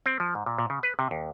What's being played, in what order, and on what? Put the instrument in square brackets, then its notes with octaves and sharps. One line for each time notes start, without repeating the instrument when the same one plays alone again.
[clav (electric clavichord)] C4
F3
G#2
A#2
A#2
C#3
B4
C3
D#2